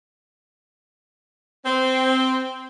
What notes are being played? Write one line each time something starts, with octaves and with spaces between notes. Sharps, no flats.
C4